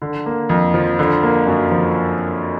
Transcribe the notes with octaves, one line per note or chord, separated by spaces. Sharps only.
D3
A#3
F2
F3
D3
A#3
F#2
F3